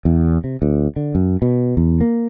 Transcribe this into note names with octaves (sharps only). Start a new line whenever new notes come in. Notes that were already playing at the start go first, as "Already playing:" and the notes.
E2
C3
D2
D3
F#2
B2
E2
A#3